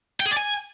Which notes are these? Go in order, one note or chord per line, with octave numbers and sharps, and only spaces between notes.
G5
G#4
D5
G#5